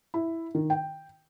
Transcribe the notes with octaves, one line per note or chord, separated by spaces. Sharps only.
E4
D#3
G5